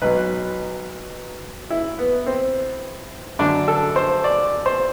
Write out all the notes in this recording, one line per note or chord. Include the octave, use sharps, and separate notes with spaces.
B1 B2 F#3 B4
E4
B3
C4
F#2 D3 F#3 D4
A4
C5
D5
C5